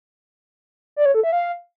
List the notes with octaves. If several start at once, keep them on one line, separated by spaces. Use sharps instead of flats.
D5
C#5
A4
E5
F5